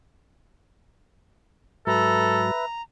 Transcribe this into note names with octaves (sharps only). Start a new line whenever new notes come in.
G#2 F#3 A4 B4 E5 A#5